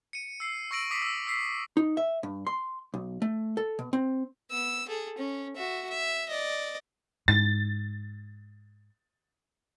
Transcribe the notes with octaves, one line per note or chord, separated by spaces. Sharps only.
C#7 D#7
E6 C7
C#6 E6 A#6 D7 F#7
D6 D#6 B6 C7 D7
E6
E6 B6 C7
D#4
E5
G2
C6
B1
A3
A4
B2
C4
B3 E6
G#4 A4
C#4
F#4 E5
E5
D5 D#5
G#2 A6